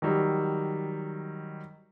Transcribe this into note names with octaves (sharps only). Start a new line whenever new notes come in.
D#3 F#3 G3